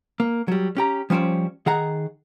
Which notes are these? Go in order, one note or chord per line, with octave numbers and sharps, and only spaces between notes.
A#3
F#3 G3
C#4 G4 A#5
F3 G3 C#4 C5 D5
D#3 G#4 F#5 A#5